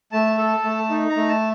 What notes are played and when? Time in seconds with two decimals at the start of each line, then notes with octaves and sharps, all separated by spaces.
0.12 A3 A5
0.38 A4
0.64 A3
0.89 D#4
1.09 A#5
1.16 A3
1.28 A5